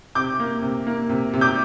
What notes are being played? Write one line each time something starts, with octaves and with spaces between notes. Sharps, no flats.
C3 D6 G6
A#3
C3
A#3
C3
C3
D6 G6